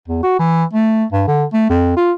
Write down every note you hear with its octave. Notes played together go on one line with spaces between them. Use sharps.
E2
F#4
E3
A3
G2
D3
A3
F2
F4